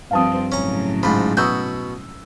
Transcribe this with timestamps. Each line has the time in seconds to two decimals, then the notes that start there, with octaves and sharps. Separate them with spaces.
0.11 G2 F3 C4 F5 A5 D#6
0.52 A2 C#3 F#3 C#4 A#5
1.03 G#2 F3 B5
1.37 B2 F#4 D#6 E6 G6